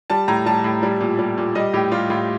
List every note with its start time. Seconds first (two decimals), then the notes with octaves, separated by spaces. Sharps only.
0.10 G3 A5
0.28 A2 A#5
0.46 G3 A5
0.64 A2
0.83 G3
1.01 A#2
1.19 G3
1.38 A#2
1.55 G3 D#5
1.73 A2 G4
1.92 G3 F4
2.10 A2 F4